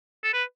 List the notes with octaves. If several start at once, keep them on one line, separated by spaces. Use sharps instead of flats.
A4
B4